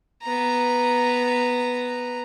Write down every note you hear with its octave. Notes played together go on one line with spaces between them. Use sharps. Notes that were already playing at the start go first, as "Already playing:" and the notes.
B3 A#5